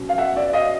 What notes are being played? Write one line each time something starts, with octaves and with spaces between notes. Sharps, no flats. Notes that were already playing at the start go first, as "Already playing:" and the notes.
Already playing: B2 F#3 C#4
F5
E5 F#5
D5 E5
D#5 F5